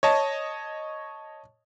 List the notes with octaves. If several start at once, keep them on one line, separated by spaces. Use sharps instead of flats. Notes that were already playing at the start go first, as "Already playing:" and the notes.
C#5 D#5 A5